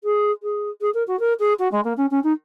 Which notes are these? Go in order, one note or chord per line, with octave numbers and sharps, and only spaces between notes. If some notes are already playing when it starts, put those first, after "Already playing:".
G#4
G#4
G#4
A#4
F#4
A#4
G#4
F#4
G#3
A#3
C#4
C#4
D#4